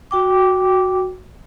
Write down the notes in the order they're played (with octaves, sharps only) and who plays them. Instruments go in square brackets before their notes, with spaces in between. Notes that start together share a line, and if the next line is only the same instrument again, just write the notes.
[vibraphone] F#4 G5 D6